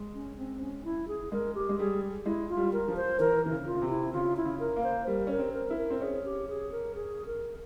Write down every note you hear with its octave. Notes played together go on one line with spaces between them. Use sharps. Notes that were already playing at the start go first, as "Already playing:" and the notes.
Already playing: G#3
C#4
C4
C#4
E4
G#4
G#3 A#4
G4
G#3
G3 G#4
G#3 E4
F4
G3
A#4
F3
C5
E3 A#4
E3
C#3
F4
C#3
C3
E4
C#3 F4
E4
C#3
A#4
A#3
C5
G3 A#4
C#4 A#4
C4
A#4
E4
A#4
C4
C#4 G#4
G4
G#4
A#4
G#4
A#4